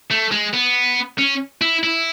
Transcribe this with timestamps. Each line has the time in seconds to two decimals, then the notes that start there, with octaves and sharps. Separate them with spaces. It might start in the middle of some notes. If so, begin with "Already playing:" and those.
0.11 A3
0.32 G#3
0.54 B3
1.18 C#4
1.62 E4
1.84 E4